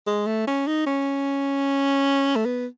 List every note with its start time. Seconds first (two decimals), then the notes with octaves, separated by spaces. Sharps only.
0.07 G#3
0.27 A3
0.47 C#4
0.67 D#4
0.87 C#4
2.36 A3
2.46 B3